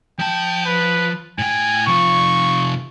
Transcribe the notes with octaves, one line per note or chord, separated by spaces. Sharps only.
F3 G5 A5
B4
A2 G5 G#5
C3 F3 C#6